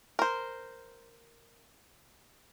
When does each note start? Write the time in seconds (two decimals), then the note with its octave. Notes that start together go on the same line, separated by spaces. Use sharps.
0.19 A#4 C5